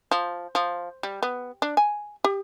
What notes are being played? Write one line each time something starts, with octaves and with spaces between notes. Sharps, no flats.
F3
F3
G3
B3
D4
G#5
G4